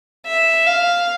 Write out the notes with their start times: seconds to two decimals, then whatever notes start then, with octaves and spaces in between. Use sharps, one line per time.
0.27 E5
0.67 F5